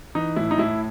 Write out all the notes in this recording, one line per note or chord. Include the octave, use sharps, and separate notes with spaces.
E3 D#4
A2 E4
D#4
A2 E4